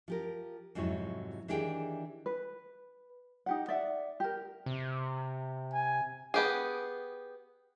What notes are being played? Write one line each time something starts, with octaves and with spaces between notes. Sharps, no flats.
F3 G4 A#4
F2 G#2 C3 F#3 E4 C#5
D#3 E3 D4 G4 G#4 G5
B4
D#4 G4 F#5
D5 E5 F#5
G4 A#4
C3
G#5
B3 G4 G#4